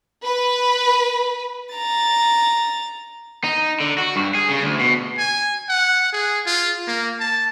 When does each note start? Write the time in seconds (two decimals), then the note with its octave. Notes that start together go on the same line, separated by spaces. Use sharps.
0.23 B4
1.75 A#5 A6
3.44 D#4
3.80 D3
3.98 F#4
4.16 G2
4.35 G#4
4.49 C#3
4.63 D2
4.79 B2
5.18 G#5
5.69 F#5
6.12 G#4
6.46 F4
6.87 A#3
7.20 A5